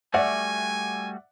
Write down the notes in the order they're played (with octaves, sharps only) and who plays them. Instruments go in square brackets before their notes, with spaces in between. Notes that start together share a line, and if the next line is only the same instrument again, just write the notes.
[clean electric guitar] G3 A3 F#4 [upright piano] D5 E5 F#5 [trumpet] G#5